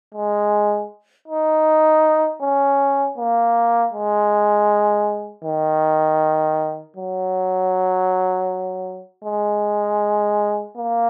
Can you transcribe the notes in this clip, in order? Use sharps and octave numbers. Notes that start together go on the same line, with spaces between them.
G#3
D#4
C#4
A#3
G#3
D#3
F#3
G#3
A#3